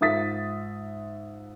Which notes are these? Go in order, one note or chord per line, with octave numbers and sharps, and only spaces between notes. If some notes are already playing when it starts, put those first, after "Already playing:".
G#2 F4 E5 D#6 A6 B6